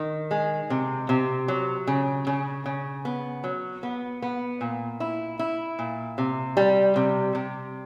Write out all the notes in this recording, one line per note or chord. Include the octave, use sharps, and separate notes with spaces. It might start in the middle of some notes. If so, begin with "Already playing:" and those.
Already playing: D#3
G#3
C3
C3
F#3
C#3
C#3
C#3
B3
F#3
B3
B3
A#2
E4
E4
A#2
C3
G3
C3
C3